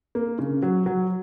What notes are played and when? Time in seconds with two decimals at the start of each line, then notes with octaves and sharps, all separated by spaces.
0.15 A#3
0.39 C#3
0.62 F#3
0.86 F#3